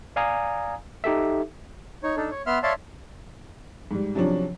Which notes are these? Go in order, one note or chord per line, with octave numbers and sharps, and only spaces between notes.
D5 F5 G#5 A#5 D#6
D#4 G4 A4 E5
D#4 C#5
D4 D#4 A4
C#5
B3 E5 C6 F6
C#5 D5 E5 F5 A5 C6
G#2 G3
C3 F3 F#3 C#4 D4